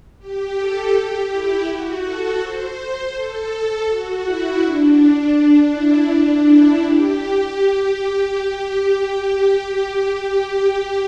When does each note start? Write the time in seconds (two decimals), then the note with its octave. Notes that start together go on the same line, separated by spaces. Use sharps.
0.19 G4
0.57 A4
0.93 G4
1.30 E4
1.67 F#4
2.04 A4
2.41 C5
3.14 A4
3.87 F#4
4.24 E4
4.60 D4
5.34 D4
5.71 E4
6.09 D4
6.44 E4
6.82 G4